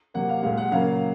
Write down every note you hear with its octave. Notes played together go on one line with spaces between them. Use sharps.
C3 F#3 A#3 F#5
F5
A#2 G#3 F5
F#5
C#3 F#3 A#3 F5